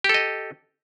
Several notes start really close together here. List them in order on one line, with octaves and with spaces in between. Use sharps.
G4 A4 D#5